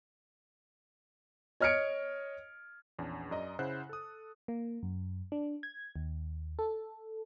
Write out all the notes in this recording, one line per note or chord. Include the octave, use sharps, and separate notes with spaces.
C#5 D#5 F6 G#6 C#7 D7
A#1 E2 C#4 D4
F#2 D5 D#5 A#5
C#3 E4 C5 F#5 F#6
A4 D#6
A#3
F#2
D4
G#6
D#2
A4